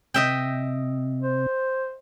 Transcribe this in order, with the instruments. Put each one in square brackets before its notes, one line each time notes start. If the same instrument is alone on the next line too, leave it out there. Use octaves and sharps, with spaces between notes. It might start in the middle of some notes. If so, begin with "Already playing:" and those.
[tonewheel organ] C3 [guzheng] D#5 E5 G5
[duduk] C5